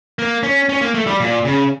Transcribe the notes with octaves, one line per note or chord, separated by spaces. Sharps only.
A#3
C#4
C#4
A#3
A3
G3
A#2
C#3